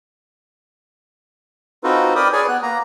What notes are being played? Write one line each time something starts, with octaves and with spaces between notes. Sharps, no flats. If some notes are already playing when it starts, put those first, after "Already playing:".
C4 D#4 F4 F#4 A4 B4
A#4 D5 G5 B5 D6 D#6
G#4 B4 C#5 D5 G#5
B3 F#6
A#3 A#5